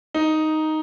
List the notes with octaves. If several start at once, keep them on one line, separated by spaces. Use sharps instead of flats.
D#4